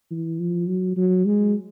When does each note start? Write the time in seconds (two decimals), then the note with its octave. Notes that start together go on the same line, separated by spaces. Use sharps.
0.11 E3
0.39 F3
0.67 F#3
0.96 F#3
1.25 G#3